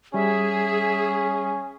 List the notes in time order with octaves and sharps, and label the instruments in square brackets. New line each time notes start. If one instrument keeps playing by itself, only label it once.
[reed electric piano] G3 [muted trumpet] C#4 [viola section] G#4 [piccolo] E5